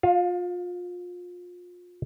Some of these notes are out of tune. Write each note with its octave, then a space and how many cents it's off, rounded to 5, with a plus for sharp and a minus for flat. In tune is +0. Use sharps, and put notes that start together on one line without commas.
F4 +30 F5 +0